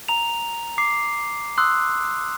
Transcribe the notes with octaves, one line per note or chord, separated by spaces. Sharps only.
A#5 F7
D6 C7
C6 D#6 E6 F#6